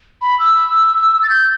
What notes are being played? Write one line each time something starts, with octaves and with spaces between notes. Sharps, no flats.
B5
E6
A6
G6